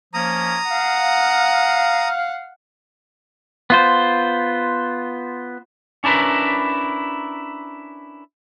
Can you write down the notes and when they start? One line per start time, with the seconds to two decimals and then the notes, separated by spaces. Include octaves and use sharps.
0.14 F3 A#3 C#4 A#5 D#6
0.70 F5 F#5
3.70 B3 F4 C5
6.04 C#4 D4 E4 A#4 B4